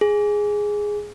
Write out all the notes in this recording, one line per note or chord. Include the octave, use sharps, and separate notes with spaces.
G#4